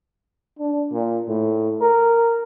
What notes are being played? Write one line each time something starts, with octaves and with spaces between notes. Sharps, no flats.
D4
A#2
A2
A#4